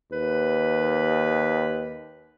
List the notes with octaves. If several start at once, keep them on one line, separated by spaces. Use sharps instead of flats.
D#2 B4